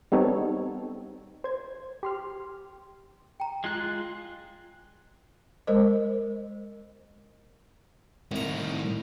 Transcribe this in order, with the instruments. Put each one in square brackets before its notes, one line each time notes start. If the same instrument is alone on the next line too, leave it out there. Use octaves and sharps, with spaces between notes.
[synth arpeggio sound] G3 B3 C4 D#4 A4 C#5
C5 G#6
G4 C6 F6
[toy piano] G5 A#5
[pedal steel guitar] G#3 F4 F#6
[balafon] G#3 A#4 C5 D#5
[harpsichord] C2 A#5 [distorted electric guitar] A2 D#3